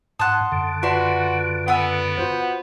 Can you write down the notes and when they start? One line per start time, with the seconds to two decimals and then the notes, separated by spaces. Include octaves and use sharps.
0.19 G#2 F#5 A5 C6 D#6 F#6
0.52 F#2 D3
0.83 F4 F#4 B4 D5 E5 A5 C6
1.68 B3 F#5 G#5 E6
2.18 F4 F#4 C5